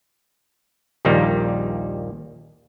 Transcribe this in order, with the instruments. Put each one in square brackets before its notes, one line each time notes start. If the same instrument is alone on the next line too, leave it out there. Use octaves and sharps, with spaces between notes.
[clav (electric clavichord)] A#1 D#2 A#2 D#3 G3 A#3